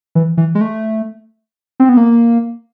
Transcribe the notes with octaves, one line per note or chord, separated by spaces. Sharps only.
E3
E3
G#3
A3
C4
B3
A#3